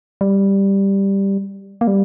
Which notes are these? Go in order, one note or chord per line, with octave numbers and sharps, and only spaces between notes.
G3
A#3
G3